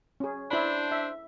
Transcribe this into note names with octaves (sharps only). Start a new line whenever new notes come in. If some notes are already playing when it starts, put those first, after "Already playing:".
C#4 G#4
D4 E4 C5 B5
E5